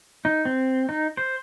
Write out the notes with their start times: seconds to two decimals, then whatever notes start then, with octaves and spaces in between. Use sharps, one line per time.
0.25 D#4
0.45 C4
0.89 D#4
1.17 C5